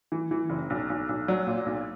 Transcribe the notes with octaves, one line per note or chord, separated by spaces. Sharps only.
E3
E3
F#1
B1
B1
B1
F#3
A#2
B1